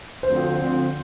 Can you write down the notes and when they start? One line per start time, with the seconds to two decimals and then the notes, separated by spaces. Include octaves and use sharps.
0.23 D2 D3 F3 C4 C5
0.57 D2 D3 F3 C4